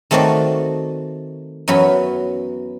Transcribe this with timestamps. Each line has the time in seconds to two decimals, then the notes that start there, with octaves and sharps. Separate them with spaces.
0.11 D#3 A3 C4 D#4 F#4 D5
1.68 F#2 E3 F#3 B3 C#5 B5